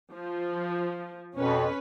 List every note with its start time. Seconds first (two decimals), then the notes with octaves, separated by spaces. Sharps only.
0.13 F3
1.37 F2 B2 C#4 B4